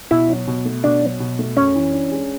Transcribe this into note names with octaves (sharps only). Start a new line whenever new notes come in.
B2 E4
F#3
B2
A3
B2 D4
F#3
B2
A3
F#2 C#4
E3
D4
G#3